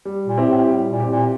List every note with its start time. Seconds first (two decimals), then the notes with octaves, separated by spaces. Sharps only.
0.05 G3
0.27 A#2
0.38 C4 E4 G4
0.48 A2
0.69 A2 G3
0.90 A#2
1.00 C4 E4 G4
1.10 A#2